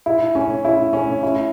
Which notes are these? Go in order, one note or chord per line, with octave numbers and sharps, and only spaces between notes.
E4
C#4
E4
C#4
E4